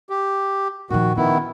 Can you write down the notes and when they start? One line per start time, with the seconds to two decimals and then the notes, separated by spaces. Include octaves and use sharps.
0.10 G4
0.90 A#2 D#3 F3 F#4
1.17 D#3 B3 C#4 E4